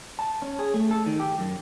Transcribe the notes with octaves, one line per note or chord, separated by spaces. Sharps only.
A5
C#4
G#4
A3
A4
D#3
G4
F#2